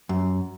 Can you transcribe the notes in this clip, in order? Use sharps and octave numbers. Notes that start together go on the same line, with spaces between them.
F#2